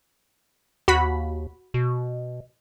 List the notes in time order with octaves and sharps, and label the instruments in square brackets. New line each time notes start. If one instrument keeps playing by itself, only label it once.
[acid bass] D#2 [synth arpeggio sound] F#4 B5 B6
[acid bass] B2